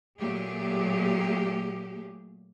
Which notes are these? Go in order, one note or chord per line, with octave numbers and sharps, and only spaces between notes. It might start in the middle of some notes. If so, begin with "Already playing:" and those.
A#2 F#3 A3 A#3 G4 G#4